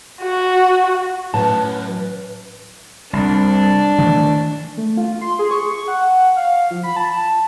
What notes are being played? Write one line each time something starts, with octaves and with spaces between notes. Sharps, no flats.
F#4
F#2 A2 B4 A5
C2 D4
D#3 E3 A3
A3
F4
C6
G#4
C#6
F#5
F5
F3
B5
A5